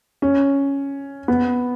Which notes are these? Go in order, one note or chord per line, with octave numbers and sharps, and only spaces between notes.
C#4
B3